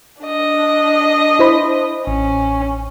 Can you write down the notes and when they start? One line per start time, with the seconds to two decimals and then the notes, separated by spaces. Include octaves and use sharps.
0.22 D4 D#5
1.39 E4 C5 B5
2.07 A1 C#4